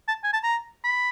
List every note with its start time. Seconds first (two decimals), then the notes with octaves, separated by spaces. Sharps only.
0.08 A5
0.24 G#5
0.33 A5
0.44 A#5
0.84 B5